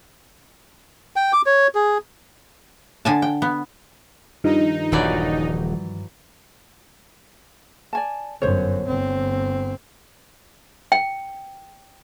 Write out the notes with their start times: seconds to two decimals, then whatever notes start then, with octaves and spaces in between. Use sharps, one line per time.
1.16 G5
1.33 D6
1.46 C#5
1.75 G#4
3.05 D3 G#5 A5
3.22 G5
3.42 B3
4.44 G2 D#3 F3 D#4
4.92 D#1 E3 F#3 D5
7.93 D5 G#5 A5
8.42 G1 F#2 C5 C#5
8.87 G1 C4
10.92 G5